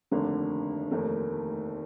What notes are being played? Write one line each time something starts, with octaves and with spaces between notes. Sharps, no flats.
F1 D#2 D3
F1 D#2 D#3 A3